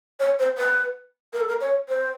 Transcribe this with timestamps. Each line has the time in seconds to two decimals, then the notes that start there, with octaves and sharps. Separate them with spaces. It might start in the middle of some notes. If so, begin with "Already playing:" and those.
0.20 C#5
0.39 C5
0.58 B4
1.33 A#4
1.40 A4
1.48 A#4
1.61 C#5
1.89 C5